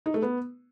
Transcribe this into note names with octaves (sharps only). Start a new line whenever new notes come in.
D#4
A3
B3